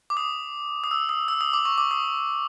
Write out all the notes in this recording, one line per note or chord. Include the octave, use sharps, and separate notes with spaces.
D6
D#6
D#6
E6
D#6
E6
D#6
D6
C#6
D6
D#6